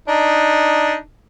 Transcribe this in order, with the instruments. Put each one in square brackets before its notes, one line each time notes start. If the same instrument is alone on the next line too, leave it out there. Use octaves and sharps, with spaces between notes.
[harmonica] D4 D#4